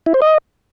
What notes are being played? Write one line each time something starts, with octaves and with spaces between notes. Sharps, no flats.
E4
C5
D#5